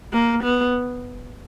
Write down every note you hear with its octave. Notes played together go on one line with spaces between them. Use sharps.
A#3
B3